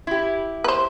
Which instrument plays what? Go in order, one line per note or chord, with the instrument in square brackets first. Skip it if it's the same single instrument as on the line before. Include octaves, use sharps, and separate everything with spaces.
[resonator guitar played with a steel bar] E4 G4
[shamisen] B4 C5